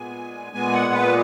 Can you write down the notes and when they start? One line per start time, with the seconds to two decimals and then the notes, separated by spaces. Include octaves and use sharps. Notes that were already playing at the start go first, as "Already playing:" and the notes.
Already playing: A#2 G#3 B3 G#5
0.52 A#2 G#3 B3 G#5
0.73 F#5
0.93 B4